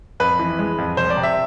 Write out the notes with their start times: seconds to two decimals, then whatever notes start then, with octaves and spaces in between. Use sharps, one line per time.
0.20 F2 B4
0.39 E3
0.59 G#3
0.78 F2
0.97 C2 C5
1.10 D5
1.17 C3
1.23 E5